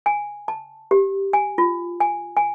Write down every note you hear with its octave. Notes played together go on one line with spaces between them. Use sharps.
G#5
A5
G4
G#5
F4
G#5
G#5